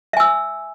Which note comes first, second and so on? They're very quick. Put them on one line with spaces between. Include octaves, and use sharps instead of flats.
E5 G#5 E6